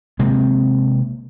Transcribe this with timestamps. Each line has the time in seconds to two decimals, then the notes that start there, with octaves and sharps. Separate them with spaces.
0.19 C3 G#3 A#3 C4